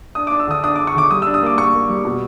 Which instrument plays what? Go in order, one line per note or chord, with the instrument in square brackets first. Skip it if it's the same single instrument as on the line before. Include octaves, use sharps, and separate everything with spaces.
[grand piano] D4 D#6
D6
D4
E6
D3 D#6
D4 D#6
D6
D4
C#6
D3 D6
G3 D#6
E6
D4
D#6
A#3 D6
A#3 C#6
A#3
G3
B2